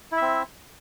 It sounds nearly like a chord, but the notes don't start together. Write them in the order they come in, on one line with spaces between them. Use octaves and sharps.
E4 E5 C4